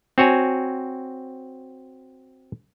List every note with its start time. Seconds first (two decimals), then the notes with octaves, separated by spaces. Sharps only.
0.18 C4 F#4 C#5 G#5